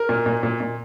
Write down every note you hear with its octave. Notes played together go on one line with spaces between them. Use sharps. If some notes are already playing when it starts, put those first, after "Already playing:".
Already playing: A#4
A#2
A#2
A#2
A#2